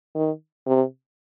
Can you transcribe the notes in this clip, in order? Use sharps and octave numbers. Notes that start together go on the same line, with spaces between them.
D#3
C3